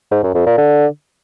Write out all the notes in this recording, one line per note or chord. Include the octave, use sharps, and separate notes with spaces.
G#2
F#2
F2
A#2
D3